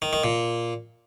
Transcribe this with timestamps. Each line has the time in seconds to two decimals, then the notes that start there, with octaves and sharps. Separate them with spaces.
0.02 D#3
0.13 D#3
0.24 A#2